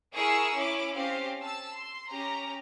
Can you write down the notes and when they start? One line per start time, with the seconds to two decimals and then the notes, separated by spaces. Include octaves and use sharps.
0.14 E4 G#4 A#4 C#6 E6
0.56 C#4 E4 D6
0.95 C4 C#4 G4 C5 F5
1.43 A5 E6
1.76 C6
2.09 C#4 G4 A#5